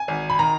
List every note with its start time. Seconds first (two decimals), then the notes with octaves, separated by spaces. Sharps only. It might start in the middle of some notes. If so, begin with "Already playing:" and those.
Already playing: G#5
0.08 G#1
0.30 B5
0.39 D#3 A#5